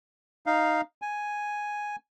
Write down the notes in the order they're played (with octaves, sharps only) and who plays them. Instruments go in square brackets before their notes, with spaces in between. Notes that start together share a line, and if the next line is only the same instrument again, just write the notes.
[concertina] D#4 F5
G#5